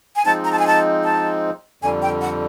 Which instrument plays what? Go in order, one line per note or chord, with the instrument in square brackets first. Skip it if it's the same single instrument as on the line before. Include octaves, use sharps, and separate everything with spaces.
[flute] G#5
[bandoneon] F3 G#3 C4 D#4 [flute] A5
[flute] A#5
A5
G#5
A5
A5
[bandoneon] F2 D3 G3 [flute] G#5
[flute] G5
F#5